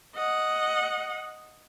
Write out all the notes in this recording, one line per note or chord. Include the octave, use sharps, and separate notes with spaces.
D#5 F#5